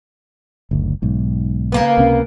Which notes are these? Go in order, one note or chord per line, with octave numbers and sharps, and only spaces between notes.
F#1 D2
B1 G#2
C#3 A#3 B3
C#2 C3 C#4